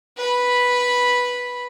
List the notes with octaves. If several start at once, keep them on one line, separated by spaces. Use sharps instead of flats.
B4 B5